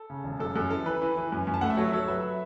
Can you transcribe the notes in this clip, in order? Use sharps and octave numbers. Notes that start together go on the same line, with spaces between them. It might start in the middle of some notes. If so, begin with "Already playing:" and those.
Already playing: A4
C#3
E1
F#2 A4
F#2 A4
E3 A4
E3 B4
E3
E3
F#2
F#2
A5
A3 F#5
E5
F#3 A4 C#5
F#3 A4 C#5
F#3 B4 E5